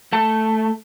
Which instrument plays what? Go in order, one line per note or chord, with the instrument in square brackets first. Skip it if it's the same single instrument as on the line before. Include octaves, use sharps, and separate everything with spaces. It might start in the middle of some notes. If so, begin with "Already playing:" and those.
[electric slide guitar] A3 A5